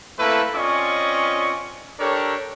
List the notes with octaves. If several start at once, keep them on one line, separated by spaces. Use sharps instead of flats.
A3 A#3 C4 E4 A4 B4
C4 C#4 F4 D5 D#5 C#6
D4 G4 A4 A#4 C#5